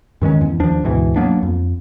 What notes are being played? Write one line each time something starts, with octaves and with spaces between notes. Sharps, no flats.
G2 D#3 G#3 C#4
E2
D#2 F3 D4
D2 G#2 B2 E3
F#3 A#3 B3 D4
F2